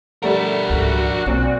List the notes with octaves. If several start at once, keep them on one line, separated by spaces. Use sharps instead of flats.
G3 A3 D4 A#4 F#5
C#2 G#2 F#4
B1 A#2 C4 D4